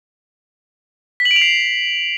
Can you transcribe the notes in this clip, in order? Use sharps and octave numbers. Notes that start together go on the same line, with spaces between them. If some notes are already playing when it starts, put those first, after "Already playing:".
B6
F#7
D7
F7
C7